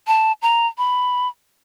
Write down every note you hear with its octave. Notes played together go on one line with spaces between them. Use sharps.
A5
A#5
B5